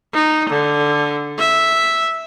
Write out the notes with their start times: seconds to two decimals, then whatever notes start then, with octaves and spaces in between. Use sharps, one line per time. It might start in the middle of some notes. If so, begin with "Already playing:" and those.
0.14 D#4
0.50 D3
1.39 E5